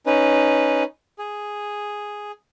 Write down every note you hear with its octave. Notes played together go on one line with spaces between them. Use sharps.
C#4 D#4 B4
G#4